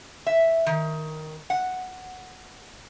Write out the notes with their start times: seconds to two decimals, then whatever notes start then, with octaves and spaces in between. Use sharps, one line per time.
0.27 E5
0.66 D#3
1.50 F#5